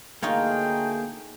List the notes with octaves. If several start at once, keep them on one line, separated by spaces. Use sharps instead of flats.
D2 A3 A#3 D#4 F4 G#4 C#5 G5